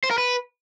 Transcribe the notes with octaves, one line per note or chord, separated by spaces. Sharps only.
C5
A#4
B4